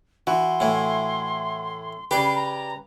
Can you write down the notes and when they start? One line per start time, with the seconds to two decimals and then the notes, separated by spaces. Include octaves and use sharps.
0.27 E3 F#4 C6
0.60 A2 E3
2.11 C#3 G4 B4 D5 C7
2.36 A#5